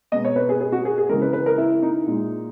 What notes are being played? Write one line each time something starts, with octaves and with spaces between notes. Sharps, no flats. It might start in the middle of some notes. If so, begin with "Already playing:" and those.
B2 G#3 D#5
C#5
B4
G#4
G#4
F#4
G#4
G#4
C#3 E3 G#3 A#4
B4
B4
A#4
E4
D#4
A#2 G#3